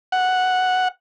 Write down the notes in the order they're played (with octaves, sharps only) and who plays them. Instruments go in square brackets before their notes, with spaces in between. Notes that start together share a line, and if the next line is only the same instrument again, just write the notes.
[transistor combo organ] F#5